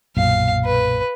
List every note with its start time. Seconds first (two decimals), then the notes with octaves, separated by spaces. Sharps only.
0.17 B1 F#2 A#2 F5
0.65 B4